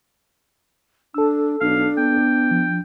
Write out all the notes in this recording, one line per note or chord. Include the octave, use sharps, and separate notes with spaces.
D4 A4 E6
B1 D4 F5
B3 G5
F3